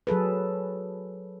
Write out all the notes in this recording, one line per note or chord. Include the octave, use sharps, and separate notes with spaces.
F#3 G#4 A4 B4